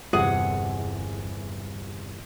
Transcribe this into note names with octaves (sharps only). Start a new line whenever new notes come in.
G1 E2 C3 G#4 F#5